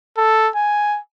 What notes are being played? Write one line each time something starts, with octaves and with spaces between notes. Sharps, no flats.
A4
G#5